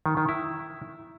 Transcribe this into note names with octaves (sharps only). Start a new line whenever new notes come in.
D#3
D#3
E4